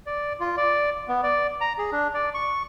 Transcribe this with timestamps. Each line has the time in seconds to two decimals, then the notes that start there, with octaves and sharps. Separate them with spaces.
0.06 D5
0.40 F4
0.57 D5
1.08 B3
1.23 D5
1.61 A#5
1.78 G#4
1.92 D4
2.14 D5
2.34 C#6